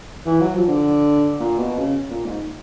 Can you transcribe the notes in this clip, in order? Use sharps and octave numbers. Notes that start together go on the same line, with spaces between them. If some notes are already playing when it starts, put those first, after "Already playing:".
E3
F#3
F3
D3
A#2
B2
C#3
A#2
G#2